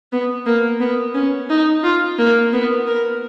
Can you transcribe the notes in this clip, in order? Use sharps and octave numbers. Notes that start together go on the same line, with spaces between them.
B3
A#3
B3
C#4
D#4
F4
A#3
B3
A#4